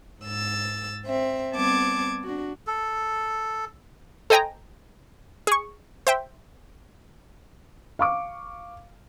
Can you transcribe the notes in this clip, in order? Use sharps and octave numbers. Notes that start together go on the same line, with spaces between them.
G#2 E6 A6
C4 E5
G3 B3 C4 A5 D6 G#6
D4 F#4
A4
A4 C5 D#5 G5 G#5 A#5
G#4 C#6
C5 E5 G5
F5 C#6 D6